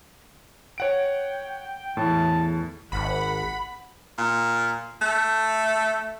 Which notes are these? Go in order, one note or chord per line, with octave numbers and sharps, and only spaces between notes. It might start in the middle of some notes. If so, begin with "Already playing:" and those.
C#5 F#5 G5 D7
E2 A2 A5
G#1 F#5 B5
A#2
A3